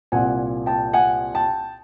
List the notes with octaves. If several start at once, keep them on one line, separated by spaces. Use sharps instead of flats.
C2 A#2 F#5 G#5
G5 A5
F#5 G#5
G5 A5